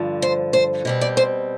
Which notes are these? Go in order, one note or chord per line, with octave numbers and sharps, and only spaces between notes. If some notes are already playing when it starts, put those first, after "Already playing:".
Already playing: G2 D3 F3
C5
C5
B2 G3 C4
D5
C5